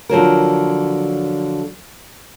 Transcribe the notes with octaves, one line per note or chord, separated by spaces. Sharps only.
D3 F3 F#3 A#4